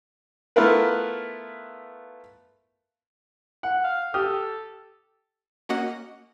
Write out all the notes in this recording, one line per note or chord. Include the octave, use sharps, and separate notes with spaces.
A3 B3 E4 F4 A#4 B4
F#5
F5
G4 A4 D#6 F6
A#3 C#4 F#4 D#5 F#5